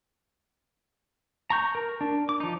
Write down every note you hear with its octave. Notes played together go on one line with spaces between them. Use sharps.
A#5 C#6 G6
A#4
D4
D6
F3 D#4